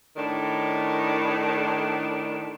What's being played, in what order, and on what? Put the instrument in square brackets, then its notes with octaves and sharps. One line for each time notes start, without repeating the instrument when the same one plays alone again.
[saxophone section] A2 D#3 D4